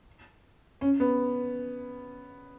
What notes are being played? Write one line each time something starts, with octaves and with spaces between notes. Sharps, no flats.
C#4
B3